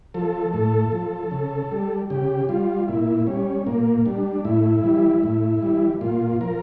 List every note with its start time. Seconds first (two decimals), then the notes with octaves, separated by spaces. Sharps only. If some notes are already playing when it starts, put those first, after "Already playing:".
0.14 F3 A4
0.53 A2 A4
0.92 F3
1.31 C#3
1.71 G3
2.10 C#3 G4
2.49 G3 F4
2.88 A#2 E4
3.27 G3 C#4
3.67 A#2 A#3
4.06 G3 D4
4.45 A2 E4
4.83 E3 G3
5.23 A2
5.62 E3 G3
6.01 A#2 F4
6.41 F3 A#4